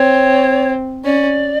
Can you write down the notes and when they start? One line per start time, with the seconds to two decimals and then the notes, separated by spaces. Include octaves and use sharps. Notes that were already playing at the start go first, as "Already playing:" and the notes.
Already playing: C4 C#5
1.05 C#4 D5